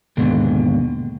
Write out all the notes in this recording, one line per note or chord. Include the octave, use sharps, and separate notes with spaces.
D#2 G#2 B2 D3